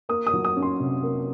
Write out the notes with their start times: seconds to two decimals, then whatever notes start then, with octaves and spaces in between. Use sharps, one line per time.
0.09 A#3 D#6
0.27 D#6
0.33 F#3
0.45 D#6
0.56 C#4
0.63 C6
0.80 C3
1.03 A#3